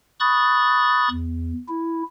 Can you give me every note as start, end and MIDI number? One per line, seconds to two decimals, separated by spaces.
0.20 1.09 83
0.20 1.09 85
0.20 1.09 87
0.20 1.09 90
0.20 1.09 93
1.10 1.53 40
1.68 2.03 64